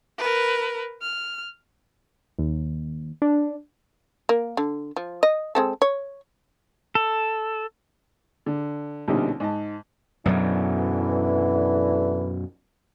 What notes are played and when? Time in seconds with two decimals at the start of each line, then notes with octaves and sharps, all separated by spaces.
0.18 A#4 B4
1.01 F6
2.39 D#2
3.22 D4
4.29 A#3
4.57 D3
4.96 F3
5.23 D#5
5.55 G#3 C4 A4
5.82 C#5
6.95 A4
8.46 D3
9.08 A#1 B2 D3 G3 C#4 D#4
9.40 G#2 D#5 A5
10.26 F#2 B2 D3 E3 F#3